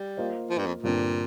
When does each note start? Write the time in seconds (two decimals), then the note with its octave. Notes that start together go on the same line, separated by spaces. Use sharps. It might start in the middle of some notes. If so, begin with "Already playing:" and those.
Already playing: G3
0.17 A#3 F4 C5 D#5
0.50 F3
0.58 G2
0.66 F2
0.83 G2 A#2 D3 G3 C4